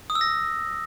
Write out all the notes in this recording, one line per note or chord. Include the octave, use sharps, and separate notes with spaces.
D#6
E6
A#6